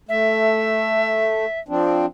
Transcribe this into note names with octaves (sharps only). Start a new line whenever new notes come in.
A3 E5
F3 C4 D4